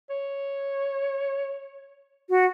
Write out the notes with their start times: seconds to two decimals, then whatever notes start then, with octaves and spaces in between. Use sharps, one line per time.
0.10 C#5
2.29 F#4